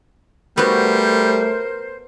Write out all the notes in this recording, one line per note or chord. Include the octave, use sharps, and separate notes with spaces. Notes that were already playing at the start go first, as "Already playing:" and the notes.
G3 A3 B3 F#4 A#4 C5